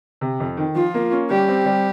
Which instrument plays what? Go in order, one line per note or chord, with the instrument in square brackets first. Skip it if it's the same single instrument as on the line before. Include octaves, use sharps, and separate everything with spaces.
[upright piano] C3
F2
D#3
[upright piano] F3 [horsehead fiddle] F4
[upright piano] A#3
C#4
[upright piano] G3 [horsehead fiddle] G4
[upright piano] C4
G3